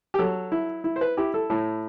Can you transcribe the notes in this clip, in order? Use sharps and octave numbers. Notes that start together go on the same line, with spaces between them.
G4
F#3 A4
E4
E4
C5
B4
E4 G4
A4
A2